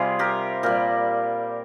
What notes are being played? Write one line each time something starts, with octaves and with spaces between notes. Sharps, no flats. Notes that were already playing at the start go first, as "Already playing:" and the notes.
Already playing: C3 G3 F4 G#4
G4 A#4
A#2 G3 G4 A#4